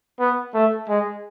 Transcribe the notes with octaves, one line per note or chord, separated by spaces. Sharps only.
B3
A3
G#3